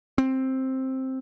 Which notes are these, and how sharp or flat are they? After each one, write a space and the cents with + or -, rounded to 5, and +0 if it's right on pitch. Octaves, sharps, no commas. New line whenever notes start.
C4 +10